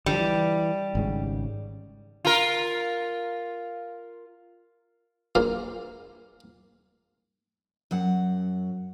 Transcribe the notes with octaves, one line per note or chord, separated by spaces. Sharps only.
D3 E3 F3 G3
E3
G#1 G#2 C#3
F4 A#4
A#1 F3 A#3 F5
F#2 F#3 F#5